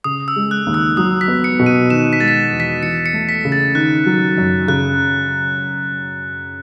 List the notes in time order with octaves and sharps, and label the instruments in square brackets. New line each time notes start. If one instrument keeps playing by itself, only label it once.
[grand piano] C#3 [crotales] D#6
[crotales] E6
[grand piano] G#3
[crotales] F#6
[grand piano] D#2
[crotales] E6
[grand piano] F#3 [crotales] D#6
[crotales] B6
[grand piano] B3
[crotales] C#7
[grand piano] B2
[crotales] D#7
[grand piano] D#3 [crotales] E7
[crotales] B6
[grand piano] G#3 [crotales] A6
[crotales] B6
[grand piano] E2
[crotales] B6
[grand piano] E3 [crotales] C#7
[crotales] C#7
[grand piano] A3
[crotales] B6
[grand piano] C#3
[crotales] A6
[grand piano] D#3 [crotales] F#6
[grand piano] F#3
F#2
[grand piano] C#3 [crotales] F#6